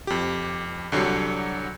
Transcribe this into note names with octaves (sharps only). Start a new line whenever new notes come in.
F2 G4
C2 D3 F#3 G4 C7